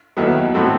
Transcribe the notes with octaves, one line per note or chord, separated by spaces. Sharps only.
D#2 D#3 F#3 B3 E4
A2 F#3 C4 F#4 A4